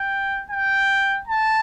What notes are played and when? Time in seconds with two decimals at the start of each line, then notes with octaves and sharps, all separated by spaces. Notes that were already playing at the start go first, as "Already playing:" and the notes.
Already playing: G5
0.50 G5
1.27 A5